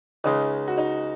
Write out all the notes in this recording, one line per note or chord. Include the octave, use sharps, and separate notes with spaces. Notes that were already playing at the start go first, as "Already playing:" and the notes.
C#2 C#3 G#3 D#4
F#4
D#4